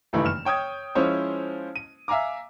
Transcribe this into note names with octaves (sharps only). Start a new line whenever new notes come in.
F#1 G2 D#3 E3 A3 B5
F6 E7
C#5 G5 D#6 G6 G#6
F3 G#3 C#4 E4 C5 C#5
D#7
E5 F5 G#5 A#5 D6